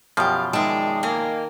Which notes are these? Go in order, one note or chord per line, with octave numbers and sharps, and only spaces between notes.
F#2 B2 F3 G4 F5
D#3 G#3 D5 E5 G5 A5
A#3 D#5 G#5